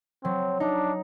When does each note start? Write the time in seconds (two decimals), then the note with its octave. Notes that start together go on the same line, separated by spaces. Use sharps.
0.24 F#3 C4
0.60 D4 D#4